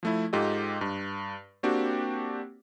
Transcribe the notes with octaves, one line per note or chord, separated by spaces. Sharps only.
F3 A3 E4
G#2 F4 G4 A4 D#5
G2
A#3 C4 D4 F#4 G4